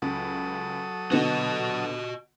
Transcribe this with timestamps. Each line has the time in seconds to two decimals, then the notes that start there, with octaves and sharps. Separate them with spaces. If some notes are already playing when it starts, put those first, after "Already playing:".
0.02 C#2 F#3 A4 D#6
1.12 B2 D3 B3 F#4 D#5